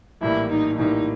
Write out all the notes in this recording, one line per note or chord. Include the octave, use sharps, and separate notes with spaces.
A#1 A2 E3 G3 A#3 E4
D#4
A#1 A2 E3 G3 A#3 D#4